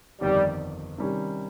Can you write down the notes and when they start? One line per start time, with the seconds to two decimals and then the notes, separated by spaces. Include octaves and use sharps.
0.21 G1 F2 D#3 G3
0.98 C3 D#3 G3 C#4